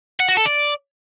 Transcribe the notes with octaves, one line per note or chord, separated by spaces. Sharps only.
F#5
F#4
A4
D5